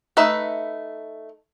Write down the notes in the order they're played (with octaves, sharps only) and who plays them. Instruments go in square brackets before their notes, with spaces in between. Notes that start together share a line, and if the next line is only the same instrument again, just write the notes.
[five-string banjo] A3 D#4 B4 E5